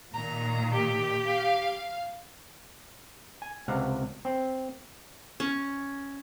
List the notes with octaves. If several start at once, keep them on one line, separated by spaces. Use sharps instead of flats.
A#2 D#3 A#5
G4
F5
G#5
C#2 C3 F5 F#5
C4
C#4